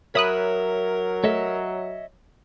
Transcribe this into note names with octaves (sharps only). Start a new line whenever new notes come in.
F#3 A#4 C#5 E5 B5 D#6 F#6
A3 C#5 D#5 E5